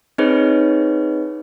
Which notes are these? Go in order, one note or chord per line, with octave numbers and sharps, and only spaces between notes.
C4 D#4 G#4 B4 C#5 D#5